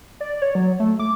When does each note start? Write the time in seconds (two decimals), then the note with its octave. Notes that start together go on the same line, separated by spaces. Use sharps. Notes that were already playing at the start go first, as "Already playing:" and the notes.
0.21 D5
0.42 C#5
0.55 F#3
0.80 A3
1.00 D6